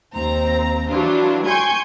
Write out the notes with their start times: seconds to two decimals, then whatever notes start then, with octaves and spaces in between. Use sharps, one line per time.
0.14 D#2 C4 A#5
0.89 E3 F#3 G3 D4 F4
1.46 G5 G#5 C6 C#6 G6 G#6